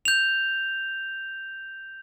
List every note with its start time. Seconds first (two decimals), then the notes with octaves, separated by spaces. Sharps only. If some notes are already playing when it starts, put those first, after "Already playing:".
0.05 G6 F7